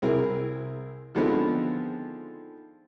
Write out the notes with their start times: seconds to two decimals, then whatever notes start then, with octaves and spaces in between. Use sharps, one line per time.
0.02 C2 C4 E4 G#4 A#4
1.15 D3 D#3 F3 G#3 B3 C4